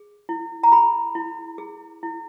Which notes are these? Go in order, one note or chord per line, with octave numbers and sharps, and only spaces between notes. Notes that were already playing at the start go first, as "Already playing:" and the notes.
Already playing: G#4
E4
A#5
G#4 B5
E4
G#4
E4